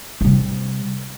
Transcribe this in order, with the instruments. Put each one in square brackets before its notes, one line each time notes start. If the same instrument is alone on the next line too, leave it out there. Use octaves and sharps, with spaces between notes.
[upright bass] C3 G3